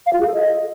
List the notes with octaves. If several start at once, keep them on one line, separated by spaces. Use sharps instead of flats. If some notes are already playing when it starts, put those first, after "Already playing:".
F5
F4
G#4
A4
D#5